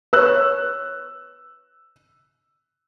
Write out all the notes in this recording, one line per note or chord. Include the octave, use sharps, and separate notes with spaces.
B4 C#5 E6 F#6